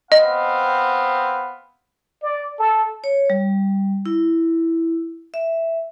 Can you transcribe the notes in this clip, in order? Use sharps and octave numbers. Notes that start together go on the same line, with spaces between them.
B3 C4 D#5 F5
D5
A4
C#5
G3
E4
E5